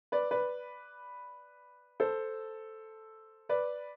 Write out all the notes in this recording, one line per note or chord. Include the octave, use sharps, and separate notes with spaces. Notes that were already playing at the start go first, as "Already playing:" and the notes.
B4 D5
B4 D5
A4 C5
B4 D5